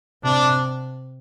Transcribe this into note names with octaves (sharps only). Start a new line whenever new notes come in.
C3 D4